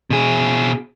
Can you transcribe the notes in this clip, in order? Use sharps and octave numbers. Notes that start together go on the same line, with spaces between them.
B2 G#4